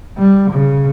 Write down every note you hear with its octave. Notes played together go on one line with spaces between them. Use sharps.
G3
C#3